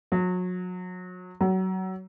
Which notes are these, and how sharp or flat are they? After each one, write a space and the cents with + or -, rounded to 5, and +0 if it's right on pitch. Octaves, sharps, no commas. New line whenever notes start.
F#3 -30
F#3 +25